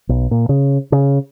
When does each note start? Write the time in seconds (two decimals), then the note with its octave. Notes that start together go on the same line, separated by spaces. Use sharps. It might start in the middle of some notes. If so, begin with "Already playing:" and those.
0.09 B1
0.31 A#2
0.49 C#3
0.92 C#3